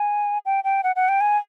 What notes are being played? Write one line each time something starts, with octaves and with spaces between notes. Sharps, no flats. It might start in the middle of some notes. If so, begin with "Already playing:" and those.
Already playing: G#5
G5
G5
F#5
F#5
G5
G#5